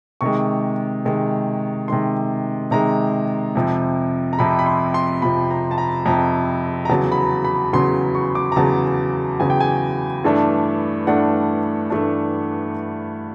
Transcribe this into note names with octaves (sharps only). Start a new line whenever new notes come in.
C3 D#3 G#3 C#6
C3 D#3 G#3
C3 D#3 G#3 C6
C3 D#3 G#3 A#5
F2 C3 F3
A#5
F2 C3 F3 B5
B5
C6
C6
F2 C3 F3 B5
A#5
A5
A#5
F2 C3 F3 A#5
A#5
E2 C#3 F#3 A5
B5
A#5
B5
E2 C#3 F#3 C6
C#6
D6
A#5
E2 C#3 F#3 A5
E2 C#3 F#3 G#5
G5
G#5
G2 E3 A3 D4
G2 E3 A3 D4 F#5
G2 E3 A3 D4